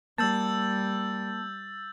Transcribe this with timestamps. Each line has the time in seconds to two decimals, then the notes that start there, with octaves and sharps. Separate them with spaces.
0.18 G3 A#3 A5 E6 G6 A6